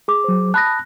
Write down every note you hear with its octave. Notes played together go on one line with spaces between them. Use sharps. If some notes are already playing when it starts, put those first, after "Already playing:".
G#4 D6
F#3 C5
A5 B5 D#6 F#6 A#6